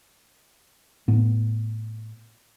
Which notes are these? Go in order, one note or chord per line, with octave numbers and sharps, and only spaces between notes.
A2 B3